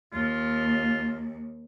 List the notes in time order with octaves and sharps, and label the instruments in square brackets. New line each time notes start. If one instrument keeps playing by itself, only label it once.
[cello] D#2 [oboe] F4